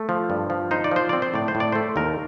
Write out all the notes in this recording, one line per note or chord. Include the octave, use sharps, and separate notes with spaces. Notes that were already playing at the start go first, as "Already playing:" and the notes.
Already playing: A3
F3
G2
F3
D#4 C5
D5
F3 C5
C4 D5
C5
A2 D5
C5
A2
D5
A3 C5
D#2 A#4